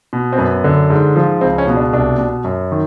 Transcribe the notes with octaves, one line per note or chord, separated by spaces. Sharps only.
B2
C4
F#2 B3
D3
G#2
F3
C#2 C4
C#4
B2
D4
C2 D4
B2
F#2
D#3